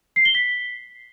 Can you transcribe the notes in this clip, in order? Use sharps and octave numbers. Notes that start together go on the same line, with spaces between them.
C7
G7
B6